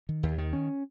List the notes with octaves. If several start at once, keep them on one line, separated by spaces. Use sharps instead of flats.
D#3
D#2
D#3
C#4